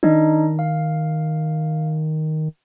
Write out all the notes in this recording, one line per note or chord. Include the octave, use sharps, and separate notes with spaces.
D#3 D4 D#4 D#5
F5